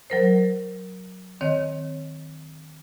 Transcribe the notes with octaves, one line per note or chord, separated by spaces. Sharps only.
F#3 A#4 C5
D#3 C4 C#5 D#5